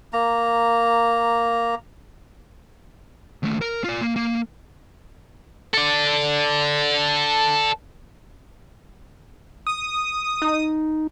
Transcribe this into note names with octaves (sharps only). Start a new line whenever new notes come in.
A#3 A#5
D#2 A3
A#4
F4 D5
A#3
A#3
A4 D5
D#6
D#4